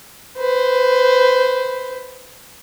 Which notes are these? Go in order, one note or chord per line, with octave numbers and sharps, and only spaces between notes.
B4 C5